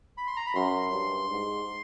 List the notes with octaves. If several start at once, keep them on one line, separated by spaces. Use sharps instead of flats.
B5
C6
A#5
B5
F#2 C6
G2
G#2